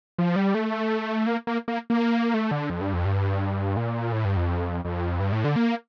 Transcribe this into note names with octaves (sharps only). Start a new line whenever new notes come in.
F3
G3
A3
A#3
A#3
A#3
A#3
A3
D3
F2
G2
F2
G2
A#2
A2
G2
F2
F2
G2
A2
D3
A#3